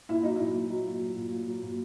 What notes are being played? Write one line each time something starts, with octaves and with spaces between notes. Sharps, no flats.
A#2 E4
F#3 D#4
A#2 E4
F#3
F#3
A#2
F#3
A#2
A#2
F#3
A#2